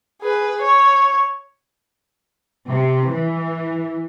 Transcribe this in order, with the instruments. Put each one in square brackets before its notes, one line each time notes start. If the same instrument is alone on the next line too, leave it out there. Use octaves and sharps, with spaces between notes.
[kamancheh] G#4 B4
C#5
[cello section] C3
E3